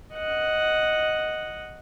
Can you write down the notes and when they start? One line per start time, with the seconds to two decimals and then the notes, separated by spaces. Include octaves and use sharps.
0.13 D#5 F#5